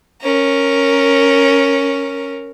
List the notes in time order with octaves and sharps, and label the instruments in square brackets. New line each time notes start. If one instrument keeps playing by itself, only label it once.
[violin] C#4 A#4